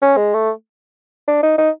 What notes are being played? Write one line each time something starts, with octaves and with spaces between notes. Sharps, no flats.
C#4
G#3
A3
D4
D#4
D#4